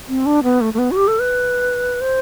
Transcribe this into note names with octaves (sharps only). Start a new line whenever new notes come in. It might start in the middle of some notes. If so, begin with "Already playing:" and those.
C4
D4
B3
A3
A3
B3
F#4
G4
A4
B4
C5